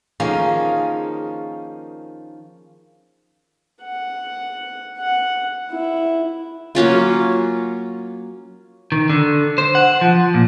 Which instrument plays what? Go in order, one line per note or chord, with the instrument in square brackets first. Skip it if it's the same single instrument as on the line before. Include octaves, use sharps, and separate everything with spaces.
[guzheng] D#3 F3 A#3 C#4 F4 G#4
[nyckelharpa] F#5
F#5
E4
[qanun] F#3 A#3 C#4 F4
[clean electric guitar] D#3
D3
C5
F#5
F3
A#2